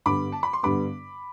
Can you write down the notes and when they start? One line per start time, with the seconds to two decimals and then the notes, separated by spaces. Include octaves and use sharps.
0.06 G2 D3 G3 B3 B5 D6
0.32 A5
0.43 B5
0.53 C6
0.63 G2 D3 G3 B3 B5 D6